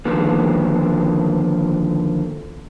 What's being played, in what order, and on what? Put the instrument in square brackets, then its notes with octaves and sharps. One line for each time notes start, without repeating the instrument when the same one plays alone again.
[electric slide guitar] D3 D#3 F3 A#3 B4